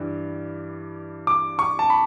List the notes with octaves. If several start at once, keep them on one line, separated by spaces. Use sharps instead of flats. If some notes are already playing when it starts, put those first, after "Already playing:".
Already playing: G2 E3 G3
D6
C#6
A5
B5